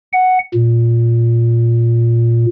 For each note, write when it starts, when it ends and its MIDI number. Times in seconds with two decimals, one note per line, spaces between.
0.13 0.38 78
0.54 2.46 46